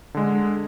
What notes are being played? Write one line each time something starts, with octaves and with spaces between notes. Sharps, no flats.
D3 G#3